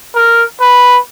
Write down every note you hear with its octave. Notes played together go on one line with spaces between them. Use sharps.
A#4
B4